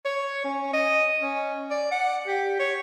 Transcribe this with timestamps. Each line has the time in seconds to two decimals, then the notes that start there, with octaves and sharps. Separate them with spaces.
0.05 C#5
0.44 C#4
0.73 D#5
1.22 C#4
1.70 D5
1.91 F#5
2.27 G4
2.59 C#5